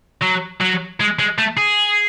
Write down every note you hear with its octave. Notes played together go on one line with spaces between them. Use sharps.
F#3
F#3
G#3
G#3
A3
G#4